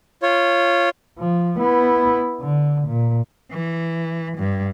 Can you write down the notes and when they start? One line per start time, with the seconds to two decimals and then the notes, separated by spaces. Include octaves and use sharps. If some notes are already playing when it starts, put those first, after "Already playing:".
0.23 F4 C#5
1.19 F3
1.58 B3 E4
2.41 D3
2.87 A#2
3.51 E3
4.38 G2